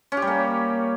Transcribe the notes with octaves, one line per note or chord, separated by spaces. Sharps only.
C#4
G4
G3
A#3